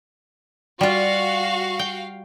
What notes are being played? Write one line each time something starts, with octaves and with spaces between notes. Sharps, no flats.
G3 F4 F#4 F5
G5